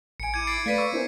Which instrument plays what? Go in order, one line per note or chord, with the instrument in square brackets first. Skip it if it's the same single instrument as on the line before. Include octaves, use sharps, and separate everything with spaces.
[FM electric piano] A1 G#5 [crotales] C#7 D7
[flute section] E4 D6 [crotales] G#6 D#7
[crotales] A6 C7 D7
[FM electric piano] A3 [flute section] B4 D5 F5 [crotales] A6 B6 D#7
[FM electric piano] C#6 D6 E6
[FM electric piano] B3 E4 A#4 [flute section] C#4 D4 C5